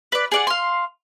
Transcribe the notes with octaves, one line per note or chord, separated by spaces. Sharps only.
B4 D5
G#4 D5 F#5
F5 C6